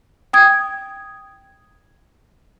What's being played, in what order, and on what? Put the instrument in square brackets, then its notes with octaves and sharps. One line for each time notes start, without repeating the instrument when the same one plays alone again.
[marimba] G5 D#6 G#6